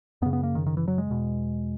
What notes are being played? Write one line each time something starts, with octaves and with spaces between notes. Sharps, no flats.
F#2 C#3 B3
B3
A#3
D#3
D#3
E3
F#3
G#3
E2 B2